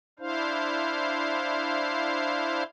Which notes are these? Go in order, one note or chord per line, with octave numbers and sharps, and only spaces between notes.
D4 E4 C5 F5